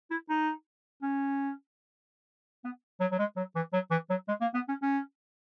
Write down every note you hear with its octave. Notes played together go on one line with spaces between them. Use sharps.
E4
D#4
C#4
B3
F#3
F#3
G#3
F#3
E3
F#3
E3
F#3
G#3
A#3
B3
C#4
C#4